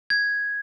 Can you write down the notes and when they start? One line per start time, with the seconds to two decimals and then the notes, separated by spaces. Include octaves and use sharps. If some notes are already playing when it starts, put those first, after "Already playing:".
0.10 G#6